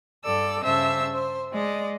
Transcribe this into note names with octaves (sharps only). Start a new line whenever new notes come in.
G2 A4 D5 E6
G2 C#3 C5 E5 A5 E6
C5
G#3 D5 D#5